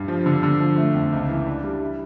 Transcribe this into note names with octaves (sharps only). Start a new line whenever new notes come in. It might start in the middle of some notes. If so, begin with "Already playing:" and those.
Already playing: G2
F3
D3
D3
F3
A3
F2
C#2
E3
D4
G3
E4